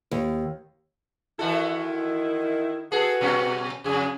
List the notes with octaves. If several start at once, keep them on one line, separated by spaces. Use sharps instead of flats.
D#2
D#3 E3 E4 F#4 A4
F#4 G#4 A4 B4
B2 G3 C#4
F2 C#3 G#4